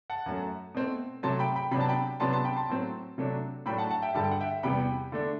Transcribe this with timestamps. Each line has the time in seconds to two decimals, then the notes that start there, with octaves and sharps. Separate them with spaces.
0.10 F#5 A5
0.26 F#2 F#3 A3
0.74 B2 A3 C4
1.23 C3 F#3 A3 A5 C6
1.39 G5 B5
1.56 G5 B5
1.71 C3 F#3 B3 D4 B5
1.80 A5
1.88 G5 B5
2.20 C3 F#3 B3 D4 A5 C6
2.33 A5 C6
2.44 G5 B5
2.56 A5 C6
2.69 A2 F#3 C4
3.18 C3 F#3 A3 D4
3.66 A2 F#3 A3 D4 G5 B5
3.78 F#5 A5
3.90 F#5 A5
4.02 E5 G5
4.14 G2 D3 G3 A5
4.24 G5
4.31 F#5
4.41 E5 G5
4.63 E2 C3 G3 B3 G5 B5
5.12 D3 A3 D4